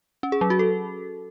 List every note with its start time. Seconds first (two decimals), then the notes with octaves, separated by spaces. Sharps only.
0.23 C#4
0.32 G#4
0.41 F#3
0.50 F#4
0.59 A4